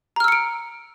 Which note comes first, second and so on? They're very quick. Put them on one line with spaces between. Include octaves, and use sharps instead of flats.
A#5 F6 E6 C#7 D7